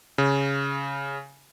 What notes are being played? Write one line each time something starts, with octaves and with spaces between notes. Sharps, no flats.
C#3